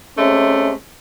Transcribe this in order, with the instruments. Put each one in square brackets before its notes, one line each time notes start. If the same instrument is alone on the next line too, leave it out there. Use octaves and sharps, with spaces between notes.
[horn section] C3 G#3 A3 [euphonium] C#4